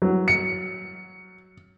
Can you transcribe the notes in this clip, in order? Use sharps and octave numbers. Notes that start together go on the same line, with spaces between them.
F#3
C#7